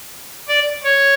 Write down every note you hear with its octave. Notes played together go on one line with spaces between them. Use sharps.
D5
C#5